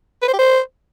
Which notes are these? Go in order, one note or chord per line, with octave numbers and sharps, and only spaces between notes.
B4
C5
G4
C5